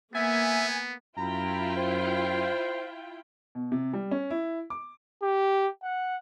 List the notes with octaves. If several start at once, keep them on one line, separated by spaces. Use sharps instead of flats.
A#3 B3 E5 G#5
F#2 E4 F4 G5 A#5 B5
C5
B2
C3
G3
C#4
E4
D6
G4
F#5